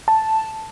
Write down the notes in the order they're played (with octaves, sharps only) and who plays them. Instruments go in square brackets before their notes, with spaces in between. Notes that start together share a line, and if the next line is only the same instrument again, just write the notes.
[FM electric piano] A5